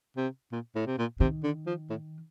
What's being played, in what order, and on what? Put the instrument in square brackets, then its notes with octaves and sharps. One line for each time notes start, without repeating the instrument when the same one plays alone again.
[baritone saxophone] C3
A#2
A2
C3
A#2
[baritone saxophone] C3 [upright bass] D#3
[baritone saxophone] D3
F3
A2